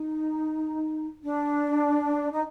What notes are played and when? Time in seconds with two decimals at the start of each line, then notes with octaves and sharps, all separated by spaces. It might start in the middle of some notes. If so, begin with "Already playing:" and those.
Already playing: D#4
1.23 D4
2.32 D#4